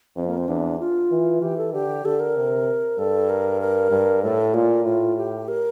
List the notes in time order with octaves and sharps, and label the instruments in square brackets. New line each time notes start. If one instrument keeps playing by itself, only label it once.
[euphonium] F2 [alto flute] C4
[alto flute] A#3
C4
[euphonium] E2 [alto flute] D4
[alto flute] F4
[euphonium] E3
[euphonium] E3 [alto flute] G4
[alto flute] A4
[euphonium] D3 [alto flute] G4
[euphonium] D3 [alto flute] A4
[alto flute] A#4
[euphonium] C3
[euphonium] G2 [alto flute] A4
[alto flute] A#4
A#4
[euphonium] G2
[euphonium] A2 [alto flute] A4
[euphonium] A#2 [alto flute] F4
[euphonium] A2 [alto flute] F4
[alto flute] G4
A#4